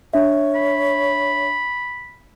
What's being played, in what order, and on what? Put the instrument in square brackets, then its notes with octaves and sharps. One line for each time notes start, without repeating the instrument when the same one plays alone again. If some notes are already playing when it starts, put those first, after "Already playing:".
[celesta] D4 E5 [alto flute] C#5
[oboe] B5